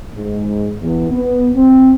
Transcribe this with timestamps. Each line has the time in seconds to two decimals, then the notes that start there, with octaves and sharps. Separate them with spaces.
0.15 G#2
0.80 E2
1.09 B3
1.55 C4